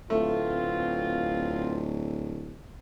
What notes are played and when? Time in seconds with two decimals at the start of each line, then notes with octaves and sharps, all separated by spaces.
0.10 D1 A3 B3 C4 F4